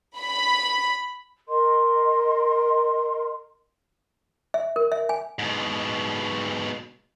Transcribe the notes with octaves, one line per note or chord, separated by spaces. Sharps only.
B5
A#4 D#5 C6
E5
A#4
E5
G#5
G#2 B2